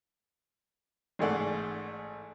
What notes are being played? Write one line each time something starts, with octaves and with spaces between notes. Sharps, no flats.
A1 G#2 G#3 A3 D5 F#5